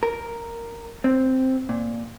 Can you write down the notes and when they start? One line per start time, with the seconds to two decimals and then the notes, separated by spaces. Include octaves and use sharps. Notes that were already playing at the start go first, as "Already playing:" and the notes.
0.03 A#4
1.04 C4
1.69 A#2